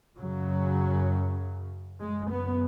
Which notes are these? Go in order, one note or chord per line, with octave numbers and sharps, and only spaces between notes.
F#2 C#3 F#3
F#2 C#3 G#3
B3